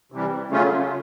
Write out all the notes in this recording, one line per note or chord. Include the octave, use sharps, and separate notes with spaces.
C3 E3 G3
C#3 F#3 A3 C#4 F4